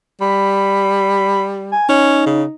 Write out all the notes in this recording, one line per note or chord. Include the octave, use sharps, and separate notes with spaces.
G3 B5
G#5
C#4 D#4
C#3